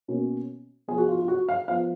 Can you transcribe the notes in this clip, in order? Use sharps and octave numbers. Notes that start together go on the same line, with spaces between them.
B2 A#3 C#4
F3 B3 G#4
F#4
F4
F4
F#4
F5
F3 B3 F5